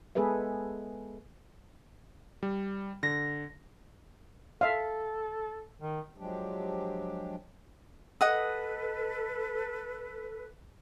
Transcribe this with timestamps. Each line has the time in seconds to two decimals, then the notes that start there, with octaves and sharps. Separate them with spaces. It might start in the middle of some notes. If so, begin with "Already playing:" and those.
0.15 G#3 B3 G#4 A4 B4 E5
2.43 G3
3.03 D3 A#6
4.61 A4 E5 F5
5.80 D#3
6.18 F3 F#3 G#3 D4 G4
8.21 A4 B4 D#5 F#5 D#6